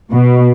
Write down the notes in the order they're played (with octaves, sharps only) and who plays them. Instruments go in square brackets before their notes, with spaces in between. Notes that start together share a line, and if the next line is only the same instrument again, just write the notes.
[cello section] B2